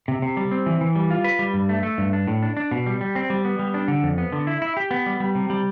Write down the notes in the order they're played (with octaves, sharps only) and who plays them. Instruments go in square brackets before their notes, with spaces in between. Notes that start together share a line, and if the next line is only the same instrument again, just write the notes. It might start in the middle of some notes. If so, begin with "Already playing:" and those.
[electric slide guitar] C3
C3
G3
C4
E3
E3
G3
F4
B4
G3
G2
A3
A3
G2
D4
A2
D4
D4
B2
G3
G3
C4
G3
B3
G3
D4
D3
F2
B3
D3
E4
E4
G4
B3
G3
G3
C3
G3